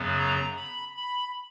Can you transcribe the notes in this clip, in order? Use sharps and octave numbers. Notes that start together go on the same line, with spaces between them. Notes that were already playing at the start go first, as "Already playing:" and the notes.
Already playing: F#2 C#3 F#3 B3
A#5
B5
B5